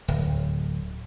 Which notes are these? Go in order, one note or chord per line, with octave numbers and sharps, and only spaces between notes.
D1